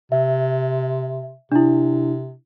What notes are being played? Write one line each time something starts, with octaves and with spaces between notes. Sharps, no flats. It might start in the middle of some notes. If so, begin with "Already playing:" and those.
C3 E5
C3 D4 E4